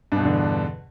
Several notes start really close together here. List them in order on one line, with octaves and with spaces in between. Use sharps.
G2 B2 E2 D3